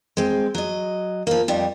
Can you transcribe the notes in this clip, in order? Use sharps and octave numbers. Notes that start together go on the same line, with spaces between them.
G#3 C4
F#3 D#5
F3 A#3
F2 G3